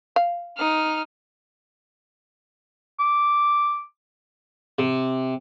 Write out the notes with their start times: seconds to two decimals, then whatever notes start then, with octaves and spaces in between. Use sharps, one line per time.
0.16 F5
0.58 D#4 F6
2.99 D6
4.79 C3